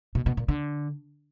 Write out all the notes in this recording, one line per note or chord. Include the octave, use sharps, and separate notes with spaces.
B2
B2
A#2
D3